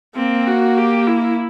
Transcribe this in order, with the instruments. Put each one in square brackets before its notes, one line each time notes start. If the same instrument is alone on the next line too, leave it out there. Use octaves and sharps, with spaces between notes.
[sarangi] A#3 [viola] C4
[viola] F#4
G4
E4